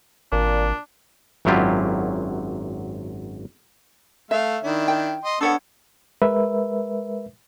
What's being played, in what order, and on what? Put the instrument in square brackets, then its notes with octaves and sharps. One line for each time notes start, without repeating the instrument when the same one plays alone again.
[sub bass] G#1 [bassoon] A#2 [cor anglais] D4
[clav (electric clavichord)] G#1 F#2 F#3 E4 F4 G4
[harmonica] A3 F5 [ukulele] E5
[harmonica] D#3 D4 E4
[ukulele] G5
[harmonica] D#5 C6
[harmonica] B3 A4 [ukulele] D4 C#5 F#5
[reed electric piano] G#3 A#4 B4 E5